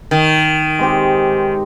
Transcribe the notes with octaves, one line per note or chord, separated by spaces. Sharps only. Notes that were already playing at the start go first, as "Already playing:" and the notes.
D#3
G#3 C4 G4